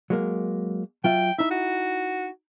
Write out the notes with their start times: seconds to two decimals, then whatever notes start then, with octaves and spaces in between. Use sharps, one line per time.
0.10 F#3 G#3 A#3
1.04 F#3 F4 E5 G5
1.39 D#4 E4 E5
1.51 F#4